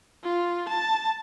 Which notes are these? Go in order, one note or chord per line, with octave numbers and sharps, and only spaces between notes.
F4
A5